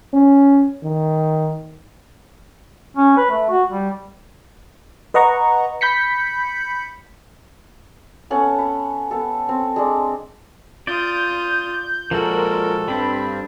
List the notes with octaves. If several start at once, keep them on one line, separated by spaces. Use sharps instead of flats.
C#4
D#3
C#4
B4
A3
F#4
G3
B4 D#5 F#5 A#5 C#6
B5 G6 B6 C#7
B3 C#4 A4 F#5
B5
B3 G4 A4
C4
G#3 D4
F4 D5 D#6 G6
A#2 F3 G#3 F#4 A4 A#4
G2 G3 C4 D4 B5